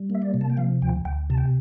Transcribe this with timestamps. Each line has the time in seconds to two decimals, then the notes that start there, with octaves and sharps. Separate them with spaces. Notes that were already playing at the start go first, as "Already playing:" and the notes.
Already playing: G3
0.10 A#3 E5
0.22 D5
0.34 C3
0.41 A5
0.50 G5
0.57 F3 F5
0.82 D2 G5
1.05 D2 G5
1.30 C3 A5
1.38 G5